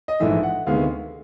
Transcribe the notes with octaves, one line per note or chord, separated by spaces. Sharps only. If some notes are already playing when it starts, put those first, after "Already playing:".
D#5
A#1 G#2 E3 A3 E5
F#5
D2 C3 D#3 G#3 B3 F5